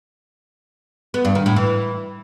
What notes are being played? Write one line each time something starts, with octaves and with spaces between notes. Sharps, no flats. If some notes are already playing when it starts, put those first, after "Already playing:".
B3
G2
D#3
A2
E3